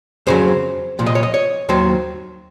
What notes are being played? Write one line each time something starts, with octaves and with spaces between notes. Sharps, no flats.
F2 C#3 F#3 C5
C2 A#2 F3
D#5
C#5
D#5
C#5
D#2 D#3 F#3 C5